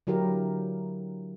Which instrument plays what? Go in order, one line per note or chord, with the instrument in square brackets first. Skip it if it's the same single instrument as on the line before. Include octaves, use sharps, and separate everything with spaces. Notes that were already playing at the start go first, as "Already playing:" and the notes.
[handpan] D3 F#3 E4 G4 A#4